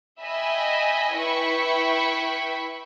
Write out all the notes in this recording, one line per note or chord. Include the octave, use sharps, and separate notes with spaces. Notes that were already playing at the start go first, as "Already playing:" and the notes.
D#5 E5 G5 G#5 B5
E4 B4 G5 B5 C#6